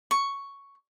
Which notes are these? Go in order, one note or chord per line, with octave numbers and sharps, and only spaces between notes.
C#6